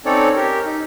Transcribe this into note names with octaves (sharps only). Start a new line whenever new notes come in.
C4 C#4 D#4 A4 C#5 D5
G4 A#4
D#4